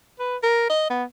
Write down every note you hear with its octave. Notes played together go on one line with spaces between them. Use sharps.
B4
A#4
D#5
B3